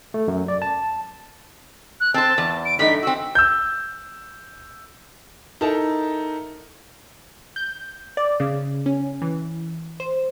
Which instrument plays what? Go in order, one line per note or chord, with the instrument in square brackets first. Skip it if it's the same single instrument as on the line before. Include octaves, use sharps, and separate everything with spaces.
[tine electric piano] A3
F#2
D5
A5
[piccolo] F#6
[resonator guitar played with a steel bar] C4 C5 [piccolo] A5
[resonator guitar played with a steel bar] E2
[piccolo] D7
[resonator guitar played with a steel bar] G2 A3 D#4 [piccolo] B6
[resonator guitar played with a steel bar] C4 F#4 [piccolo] E6
[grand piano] E6 G6
[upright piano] D#4 E4 A4 A#4 A5
[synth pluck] G6
D5
C#3
C#4
E3
C5